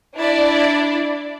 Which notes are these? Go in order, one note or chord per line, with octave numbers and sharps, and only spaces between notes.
D4 E4 D5